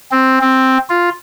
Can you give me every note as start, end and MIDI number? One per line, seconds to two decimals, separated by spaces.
0.12 0.39 60
0.41 0.78 60
0.90 1.10 65